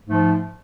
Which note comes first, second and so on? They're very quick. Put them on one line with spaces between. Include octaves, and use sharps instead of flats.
G#2 A3 F3